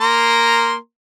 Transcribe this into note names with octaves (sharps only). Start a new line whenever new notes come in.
A#3 A#5 C6